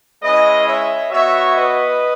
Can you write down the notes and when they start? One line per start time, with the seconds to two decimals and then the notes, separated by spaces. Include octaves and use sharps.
0.23 G#3 C#4 E4 B4 D#5
0.68 C#5 E5
1.12 B3 F#4 C#5 E5
1.56 B4 D#5